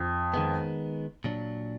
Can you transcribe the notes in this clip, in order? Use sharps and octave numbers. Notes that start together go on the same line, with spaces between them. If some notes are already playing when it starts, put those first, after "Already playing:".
Already playing: F2
D#3 G#3 B3
A#2 F#3 D4